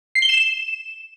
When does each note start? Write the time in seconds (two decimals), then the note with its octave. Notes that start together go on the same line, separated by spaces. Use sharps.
0.15 C7
0.22 G7
0.29 E7